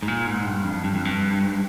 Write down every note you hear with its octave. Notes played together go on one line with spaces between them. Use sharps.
G#2
A#2
G#2
G2
F2
G2
F2
G2